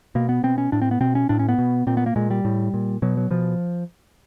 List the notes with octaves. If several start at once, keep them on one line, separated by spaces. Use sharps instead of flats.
B2 A#3
B3
B2 C4
C#4
A2 D4
C4
B3
B2 C4
C#4
A2 D4
C#4
B3
B2
A#2 C4
B3
A#3
A#2 G#3
G3
A2
A#2
B2 F#3
F#3
B2 F3